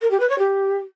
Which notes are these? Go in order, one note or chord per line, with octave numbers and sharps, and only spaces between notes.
A#4
G4
B4
C#5
G4